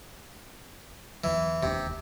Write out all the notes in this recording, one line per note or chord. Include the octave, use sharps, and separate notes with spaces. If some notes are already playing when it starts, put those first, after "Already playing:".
E2 E3 F#3
E1 D#2 C3 D4